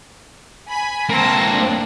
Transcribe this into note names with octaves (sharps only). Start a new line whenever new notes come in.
G#5 B5
A#3 C4 A5 A#6
D4